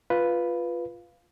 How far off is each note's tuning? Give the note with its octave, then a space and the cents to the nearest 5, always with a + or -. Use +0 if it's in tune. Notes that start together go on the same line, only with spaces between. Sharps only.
F4 +0 B4 +0